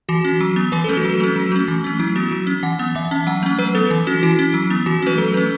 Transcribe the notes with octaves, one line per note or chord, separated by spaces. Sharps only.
E3 F#4
C#4
F#3
B3
E3 B4
A3 C#4 A4
F#4
F#3 A4
A3 C#4
F#3 F#4
A3 C#4
E3
A3 C#4
F#3 E4
B3 F#4
F#3
C#4
E3 F#5
B3
E3 E5
C#4 A5
F#3 F#5
A3 C#4
F#3 B4
B3 A4
E3
C#4 F#4
E3 E4
C#4
F#3
B3
E3 F#4
A3 C#4 B4
F#3 A4
A3 C#4